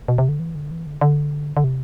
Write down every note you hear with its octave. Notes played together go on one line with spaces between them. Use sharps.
B2
C3
D3
E3
D3
E3
D3
D3
D3
C3